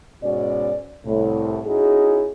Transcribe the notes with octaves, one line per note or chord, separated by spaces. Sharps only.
G#2 B2 C#4 F#4 D5
C2 A2
C#4 D#4 E4 F#4 G#4